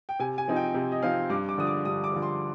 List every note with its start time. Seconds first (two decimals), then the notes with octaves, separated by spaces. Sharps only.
0.09 G5
0.19 C3 G#5
0.38 G#5
0.48 F3 C4 D#4
0.56 G5
0.74 C3
0.92 D#5
1.02 F3 C4 D#4 F5
1.30 G2 D6
1.49 D6
1.58 D3 F3 D#6
1.67 D6
1.85 G2 D#6
2.04 D6
2.13 D3 F3
2.22 C6